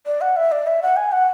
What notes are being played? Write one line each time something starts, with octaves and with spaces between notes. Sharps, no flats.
D5
F#5
E5
D5
E5
F#5
G#5
F#5